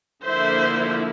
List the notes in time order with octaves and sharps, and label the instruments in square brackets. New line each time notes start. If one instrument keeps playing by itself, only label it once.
[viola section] D3 F3 A#3 E4 C5 E5